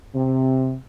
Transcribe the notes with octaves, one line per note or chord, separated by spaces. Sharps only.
C3